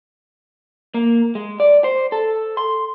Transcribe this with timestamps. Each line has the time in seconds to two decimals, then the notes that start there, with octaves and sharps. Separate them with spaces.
0.94 A#3
1.35 G#3
1.60 D5
1.84 C5
2.12 A4
2.57 C6